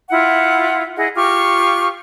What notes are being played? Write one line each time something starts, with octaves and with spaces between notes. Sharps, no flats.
E4 F4 F#5
E4 G#4 D#5 F#5
F4 G4 C#6 F6